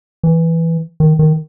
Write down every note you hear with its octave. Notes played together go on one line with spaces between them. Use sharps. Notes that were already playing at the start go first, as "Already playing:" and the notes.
E3
D#3
D#3